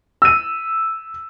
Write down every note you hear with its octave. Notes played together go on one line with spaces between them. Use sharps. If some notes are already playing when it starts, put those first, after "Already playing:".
E6 D#7